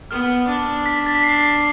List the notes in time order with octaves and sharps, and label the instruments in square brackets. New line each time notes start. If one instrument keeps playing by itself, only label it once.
[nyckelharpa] B3 [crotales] F6
[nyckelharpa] D4
[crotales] B6
A6
B6
C7